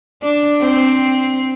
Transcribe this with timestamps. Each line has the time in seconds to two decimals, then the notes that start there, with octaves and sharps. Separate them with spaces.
0.23 D4
0.61 C4